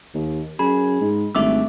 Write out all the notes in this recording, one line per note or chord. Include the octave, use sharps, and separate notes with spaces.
D#2
F#2 G#4 B5
G#2
G#1 G3 A3 D4 E5 D6 E6